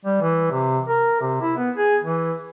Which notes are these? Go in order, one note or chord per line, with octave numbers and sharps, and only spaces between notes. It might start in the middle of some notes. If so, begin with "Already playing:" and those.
G3
E3
C3
A#4
C3
E4
B3
G#4
E3